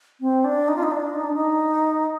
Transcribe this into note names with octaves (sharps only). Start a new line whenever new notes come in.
C4
D4
D#4
F4
D#4
D4
D#4
D4
D#4